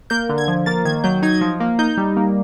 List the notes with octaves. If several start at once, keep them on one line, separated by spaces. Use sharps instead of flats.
A#3 G6
D3
G#6
F3
A#3 A6
D#3 G#6
F#3 G6
D#4 G#6
F3
A#3
D#4 G6
G3
A#3